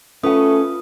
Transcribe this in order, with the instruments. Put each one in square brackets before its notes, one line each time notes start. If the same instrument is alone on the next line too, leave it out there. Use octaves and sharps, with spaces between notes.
[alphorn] A3 [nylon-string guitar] C#4 F#5 [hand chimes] F4 B4 D#6